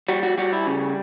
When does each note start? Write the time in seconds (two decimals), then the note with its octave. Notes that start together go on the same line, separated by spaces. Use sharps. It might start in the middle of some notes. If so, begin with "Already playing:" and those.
0.08 G3 F#4
0.23 F#4
0.38 G3 F#4
0.53 E4
0.67 C#3